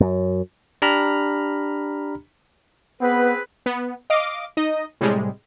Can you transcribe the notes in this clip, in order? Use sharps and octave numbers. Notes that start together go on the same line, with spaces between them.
F#2
D4 G4 A#5 B5 F6
B3 C4 G#4 B4
B3
D#5 F5 D6
D#4 D#5
A2 C3 G3 G#3